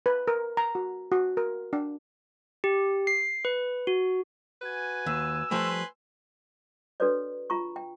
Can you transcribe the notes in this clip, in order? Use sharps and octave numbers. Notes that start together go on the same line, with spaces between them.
B4
A#4
A#5
F#4
F#4
A#4
D4
G4
C7
B4
F#4
F#4 B4 G#5
D#2 E6
F3 G3 A3 B4 G#5 C6
D4 F#4 A4 B4 C#5 D5
F4 A#5 C#6
G5